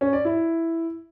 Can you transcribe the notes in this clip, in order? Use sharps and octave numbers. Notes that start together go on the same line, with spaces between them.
C#4
D5
E4